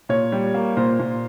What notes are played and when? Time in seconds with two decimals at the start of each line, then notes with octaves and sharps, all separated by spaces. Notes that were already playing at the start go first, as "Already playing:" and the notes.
0.09 A#2 C#5
0.32 G3
0.54 A#3
0.77 A#2 C5
0.99 A#2